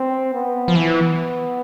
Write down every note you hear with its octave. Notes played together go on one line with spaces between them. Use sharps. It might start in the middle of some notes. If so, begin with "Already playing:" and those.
Already playing: C4
B3
F3
E3 B3